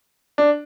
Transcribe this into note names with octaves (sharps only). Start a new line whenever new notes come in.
D4